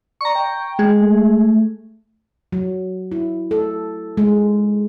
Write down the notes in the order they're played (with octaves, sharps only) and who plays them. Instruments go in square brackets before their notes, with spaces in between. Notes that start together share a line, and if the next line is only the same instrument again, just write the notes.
[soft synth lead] D5 [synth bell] A#5 C#6
[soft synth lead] G5
[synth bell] G#3 G#4
[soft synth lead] A3
[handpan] F#3
E4
A4
G#3